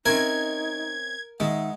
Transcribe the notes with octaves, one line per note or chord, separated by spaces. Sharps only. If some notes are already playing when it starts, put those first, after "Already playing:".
C4 C#4 D#4 A#4 E5 G#6
D#3 G#3 D#4 E5 F#5